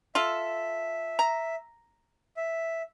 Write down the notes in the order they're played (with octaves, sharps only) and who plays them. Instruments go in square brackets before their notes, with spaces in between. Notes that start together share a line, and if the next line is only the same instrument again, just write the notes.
[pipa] F4 A4 [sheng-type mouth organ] E5
[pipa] A#5
[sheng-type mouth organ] E5